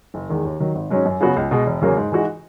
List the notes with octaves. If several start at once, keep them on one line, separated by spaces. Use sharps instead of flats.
F#1
E2 D#3 G#3
D#2
D#3 F#3
G#1
G#2 F#3 C#4
F#2
C#3 F#3 B3 F#4
C#2
B2 G#3
E1
E2 C#3 F#3 A#3
G#2
E3 G#3 D#4 F#4